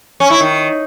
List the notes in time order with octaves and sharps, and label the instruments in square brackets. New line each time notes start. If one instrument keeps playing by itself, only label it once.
[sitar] C#4
E4
D#3